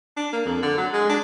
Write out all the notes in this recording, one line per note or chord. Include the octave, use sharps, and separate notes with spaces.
D4
A#3
F2
D3
F#3
G#3
D4